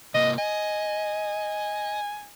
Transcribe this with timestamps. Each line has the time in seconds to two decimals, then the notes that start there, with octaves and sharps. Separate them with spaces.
0.15 C3 A#3 D#5
0.38 D#5 G#5